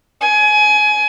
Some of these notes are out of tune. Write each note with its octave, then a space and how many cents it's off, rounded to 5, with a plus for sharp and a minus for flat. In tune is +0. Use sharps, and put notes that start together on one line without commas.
G#5 +25